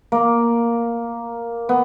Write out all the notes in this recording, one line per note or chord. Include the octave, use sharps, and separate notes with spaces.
A#3
B3